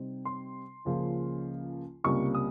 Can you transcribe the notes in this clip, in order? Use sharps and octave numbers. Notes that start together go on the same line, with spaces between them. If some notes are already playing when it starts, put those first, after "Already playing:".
Already playing: C3 G3 C4 D#4
C6
C#2 C#3 F3 A#3
C#2 C3 G3 A#3 C#6
D#6